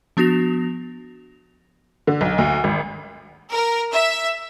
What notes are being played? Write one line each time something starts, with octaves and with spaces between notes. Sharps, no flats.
F3 B3 D4 F#4 A#6 F7
D3
B1
D2
G#1
A#4
E5